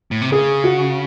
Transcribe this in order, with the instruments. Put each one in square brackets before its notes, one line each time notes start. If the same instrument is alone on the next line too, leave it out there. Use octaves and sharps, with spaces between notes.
[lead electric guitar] A2
C3
[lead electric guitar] C#3 [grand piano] G#4
[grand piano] F#4